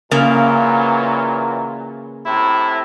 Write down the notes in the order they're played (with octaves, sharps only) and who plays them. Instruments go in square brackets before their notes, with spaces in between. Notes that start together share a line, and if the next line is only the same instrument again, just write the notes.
[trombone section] A#2 E3 F#3 [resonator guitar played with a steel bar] C#3 A#3
[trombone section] A2 C3 E4